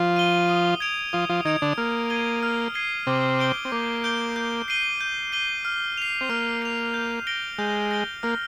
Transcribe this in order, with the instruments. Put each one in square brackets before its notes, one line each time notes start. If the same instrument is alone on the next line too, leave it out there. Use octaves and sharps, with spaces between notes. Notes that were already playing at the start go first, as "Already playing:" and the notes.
Already playing: [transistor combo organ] F3 F4
[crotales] D#7 G7
D#6
G#6 D7 F7
[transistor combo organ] F3 F4 [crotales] D#6
[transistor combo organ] F3 F4
[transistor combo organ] D#3 D#4 [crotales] G#6 D7 F7
[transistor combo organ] D3 D4
[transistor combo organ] A#3 [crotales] F6
[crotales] G#6 C7 D#7 G7
F6
G#6 C7 D#7 G7
[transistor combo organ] C3 C4 [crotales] D6
[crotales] G6 D7 G7
[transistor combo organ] C4
[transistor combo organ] A#3 [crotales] D6
[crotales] G6 D7 G7
G6
C7 D#7 G7
G6
C7 D#7 G7
F6
C7 F7
[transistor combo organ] C4
[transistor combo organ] A#3 [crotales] F6
[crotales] C7 F7
G6
A#6 D7 G7
[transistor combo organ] G#3 [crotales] G6
[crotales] A#6 D7 G7
[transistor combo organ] A#3 [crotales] F6